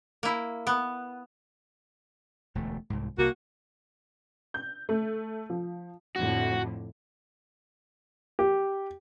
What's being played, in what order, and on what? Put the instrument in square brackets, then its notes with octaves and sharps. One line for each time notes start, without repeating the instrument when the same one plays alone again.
[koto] A#3 E4
B3
[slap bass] E1 D2 A3
C2 G#2
[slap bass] C2 [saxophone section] A#3 F#4
[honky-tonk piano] G6
A3
F3
[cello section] F2 A2 D3 [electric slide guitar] F#4
[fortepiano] G4